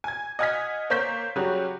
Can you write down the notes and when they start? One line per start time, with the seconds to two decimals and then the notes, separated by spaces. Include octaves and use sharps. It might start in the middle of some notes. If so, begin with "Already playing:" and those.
0.04 G#5 G#6
0.39 D#5 F#5 G#5 F6 G#6 B6
0.90 A#3 C5 C#5 G6 B6
1.36 C#3 F#3 G3 C#4 F#4 G4